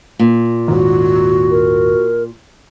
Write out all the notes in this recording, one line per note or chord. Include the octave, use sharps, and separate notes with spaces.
A#2
D#1 G#2 D#3 F#4
A#4